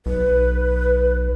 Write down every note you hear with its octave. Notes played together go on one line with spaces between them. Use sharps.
B1 B4